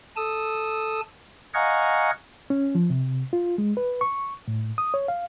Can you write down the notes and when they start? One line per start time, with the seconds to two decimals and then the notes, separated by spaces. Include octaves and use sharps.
0.17 A4 D#6 E6
1.54 D#5 F5 F#5 G#5 A#5 C#6
2.50 C#4
2.75 F3
2.90 C3
3.33 F4
3.58 G#3
3.77 B4
4.01 C#6
4.48 A2
4.78 D#6
4.94 C#5
5.08 F5